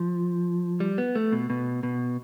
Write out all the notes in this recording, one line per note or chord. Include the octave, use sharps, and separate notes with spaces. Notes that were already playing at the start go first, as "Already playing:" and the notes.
Already playing: F3
G3
B3
A3
B2
B2
B2